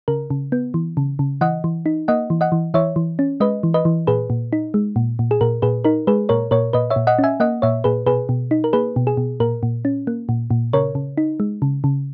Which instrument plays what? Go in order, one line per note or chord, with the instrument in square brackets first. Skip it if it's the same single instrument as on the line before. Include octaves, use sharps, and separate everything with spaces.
[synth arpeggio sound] C#3 A#4
C#3
B3
E3
C#3
C#3
E3 D#5 F#5
E3
D#4
A#3 D#5 F#5
E3
D#5 F#5
E3
E3 C#5 E5
E3
C#4
G#3 B4 D#5
E3
B4 D#5
E3
A#2 G#4 B4
A#2
D#4
G#3
A#2
A#2
G#4
A#2 A#4
A#2 G#4 B4
D#4 A#4
G#3 G#4 B4
A#2 A#4 C#5
A#2 A#4 C#5
A#2 B4 D#5
C#5 E5
A#2
D#5 F#5
C#4
E5 G#5
A#3 D#5 F#5
A#2 C#5 E5
A#2 G#4 B4
B2 G#4 B4
B2
D#4
A#4
A#3 G#4 B4
B2
G#4
B2
A#2 A#4
A#2
C#4
A#3
A#2
A#2
C#3 A#4 C#5
C#3
D#4
G#3
C#3
C#3